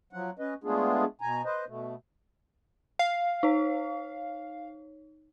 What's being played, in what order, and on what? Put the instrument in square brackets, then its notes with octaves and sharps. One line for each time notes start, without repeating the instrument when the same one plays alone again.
[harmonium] F3 F#3 F#5
C#4 B4 D#5
G#3 A3 B3 D4 F4 G#4
B2 G#5 A#5
B4 C5 D#5
B2 A3
[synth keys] F5
[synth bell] D#4 C#5